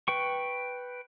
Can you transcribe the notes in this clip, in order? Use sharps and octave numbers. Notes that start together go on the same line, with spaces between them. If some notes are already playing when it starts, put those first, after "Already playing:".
B4 G5 C#6